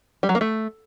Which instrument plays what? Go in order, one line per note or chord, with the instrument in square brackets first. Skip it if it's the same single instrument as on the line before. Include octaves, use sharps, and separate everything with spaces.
[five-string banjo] G3
F#3
A#3
A3